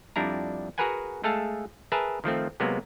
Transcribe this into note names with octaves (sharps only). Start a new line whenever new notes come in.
F2 G3 D4 E4 A#5
F#4 G#4 A#4 B4 F#5 G#5
G#3 A3 G#4 A4 F5 A5
G#4 A#4 B4 E5 A5
D#3 F3 A3 C4
C3 F#3 G#3 A#3 B3